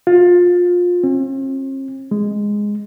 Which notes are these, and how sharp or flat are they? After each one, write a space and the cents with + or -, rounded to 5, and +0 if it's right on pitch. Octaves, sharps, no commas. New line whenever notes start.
F4 +25
C4 +45
G#3 -5